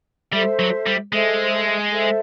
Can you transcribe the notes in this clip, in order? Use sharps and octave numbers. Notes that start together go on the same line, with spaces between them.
G3 A4 C5 E5
F#3
G3
G#3 A4 C5 E5
A4 C5 E5